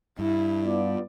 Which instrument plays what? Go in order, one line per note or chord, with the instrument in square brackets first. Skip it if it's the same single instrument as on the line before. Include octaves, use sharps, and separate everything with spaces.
[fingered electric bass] G2 [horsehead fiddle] E4
[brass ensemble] B3 F4 D5